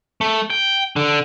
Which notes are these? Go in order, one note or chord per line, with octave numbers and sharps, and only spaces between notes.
A3
G5
D3